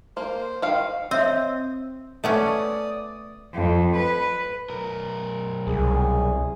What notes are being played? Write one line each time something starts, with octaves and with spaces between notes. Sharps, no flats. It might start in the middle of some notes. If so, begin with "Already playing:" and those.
A#3 C5
D#3 F5
C4 C#5 D#5 E5
A3 B3 C#4 D5 D#6
F2
B4
B1 A#4
C2 G#4